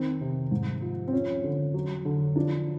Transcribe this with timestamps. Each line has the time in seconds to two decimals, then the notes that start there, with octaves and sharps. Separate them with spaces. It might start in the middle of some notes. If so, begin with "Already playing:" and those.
Already playing: D#3 C4
0.21 C3
0.51 G#2
0.82 F3
1.07 C4
1.12 F3 C#4
1.44 D3
1.74 F#3
2.05 D3
2.35 F3 D4